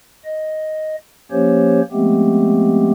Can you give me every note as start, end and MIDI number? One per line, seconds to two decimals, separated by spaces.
0.24 0.96 75
1.31 1.81 53
1.31 1.81 58
1.31 1.81 61
1.31 1.81 67
1.31 1.81 72
1.31 1.81 73
1.92 2.92 53
1.92 2.92 56
1.92 2.92 57
1.92 2.92 59
1.92 2.92 60
1.92 2.92 67